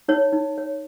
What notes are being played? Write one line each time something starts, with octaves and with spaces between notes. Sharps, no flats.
D#4 C#5
D#4
C#5